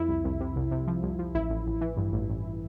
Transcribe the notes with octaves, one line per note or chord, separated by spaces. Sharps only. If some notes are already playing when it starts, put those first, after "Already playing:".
Already playing: F2 E4
C2
C2
C3
C2
C3
F3
C2
F3
A1 E4
A1
A1
E3
G2
A1
A1